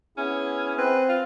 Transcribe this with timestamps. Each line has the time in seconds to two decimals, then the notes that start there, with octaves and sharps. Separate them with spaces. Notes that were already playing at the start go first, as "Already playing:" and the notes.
0.17 B3 C#4 E4 G#4
0.78 C4 B4
1.09 F4